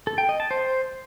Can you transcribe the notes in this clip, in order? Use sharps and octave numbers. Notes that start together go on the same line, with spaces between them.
A4
G5
D#5
A5
C5